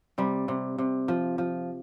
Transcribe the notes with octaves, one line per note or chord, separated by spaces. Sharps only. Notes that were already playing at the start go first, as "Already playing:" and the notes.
C3 G3
C3
C3
F3
F3